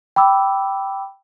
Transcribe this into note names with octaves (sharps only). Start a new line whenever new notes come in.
G5 B5 D6 E6